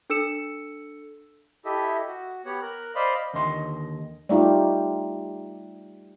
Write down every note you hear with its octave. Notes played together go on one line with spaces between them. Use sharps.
D4 A4 E6 C#7 E7
E4 G4 A4 D#5 E5
F#4
B3 G4 C#5 F#5
A#4 F#6
C5 D5 D#5 F5 B5 C6
D#2 D3 D#5 C6
G3 A3 D#4 F4 G4